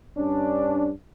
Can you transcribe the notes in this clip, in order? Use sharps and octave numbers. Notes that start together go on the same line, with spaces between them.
G2 C#4 D4